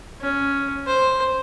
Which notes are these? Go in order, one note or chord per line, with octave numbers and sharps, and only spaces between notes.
C#4
C5